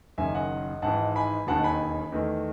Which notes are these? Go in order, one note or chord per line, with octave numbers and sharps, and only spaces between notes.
F#1 F#2 D#3 E5 G#5
D#5 F#5
G#1 G#2 E3 F#5 A5
G#5 B5
E1 D#2 D#3 F#5 A5
G#5 B5
E2 D#3 A3